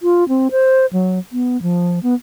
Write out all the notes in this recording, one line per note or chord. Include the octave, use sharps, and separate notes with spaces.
F4
C4
C5
F#3
B3
F3
B3